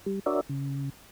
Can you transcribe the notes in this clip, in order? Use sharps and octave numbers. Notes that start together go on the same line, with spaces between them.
G3
D4 F#4 A#4 C#5 D5 E5
C#3